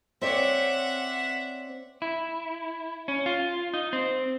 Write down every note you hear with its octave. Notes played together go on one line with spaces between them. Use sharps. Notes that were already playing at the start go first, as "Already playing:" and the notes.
C4 C#5 D5 E5 F#5
E4
C#4
F4
D#4
C4